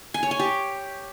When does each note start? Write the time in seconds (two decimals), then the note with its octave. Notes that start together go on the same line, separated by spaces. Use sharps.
0.14 G#5
0.23 C#5
0.31 G#5
0.39 G4